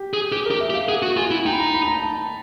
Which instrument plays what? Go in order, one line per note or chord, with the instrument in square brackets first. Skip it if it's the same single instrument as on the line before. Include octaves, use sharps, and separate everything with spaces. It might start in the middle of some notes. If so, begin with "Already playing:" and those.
Already playing: [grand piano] G4
[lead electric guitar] G#4
[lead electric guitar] G4 [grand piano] G#4
[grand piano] A#4
[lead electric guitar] G4
[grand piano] E5
[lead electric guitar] G4
[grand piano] F5
[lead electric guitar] G#4 [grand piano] F#5
[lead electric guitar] F#4
[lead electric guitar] F4 [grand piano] G#5
[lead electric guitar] E4
[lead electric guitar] D#4 [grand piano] G5
[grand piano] B5
A#5
B5
A5
A#5
A5